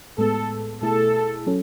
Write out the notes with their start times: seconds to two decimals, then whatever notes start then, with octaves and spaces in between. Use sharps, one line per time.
0.18 A2 G#3 B3 A4
0.82 B2 A3 E4 G#4 A4
1.47 F#3 C#4 A4